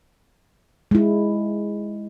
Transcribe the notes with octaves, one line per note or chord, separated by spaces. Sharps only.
G#3 E4